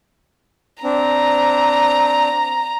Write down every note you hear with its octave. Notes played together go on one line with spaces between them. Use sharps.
C4 D4 A#5